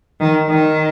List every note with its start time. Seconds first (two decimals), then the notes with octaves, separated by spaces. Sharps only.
0.20 D#3
0.49 D#3